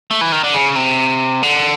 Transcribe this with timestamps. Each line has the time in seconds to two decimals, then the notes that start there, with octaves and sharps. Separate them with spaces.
0.11 A3
0.21 E3
0.32 D#3
0.44 D3
0.54 C#3
0.76 C3
1.43 D3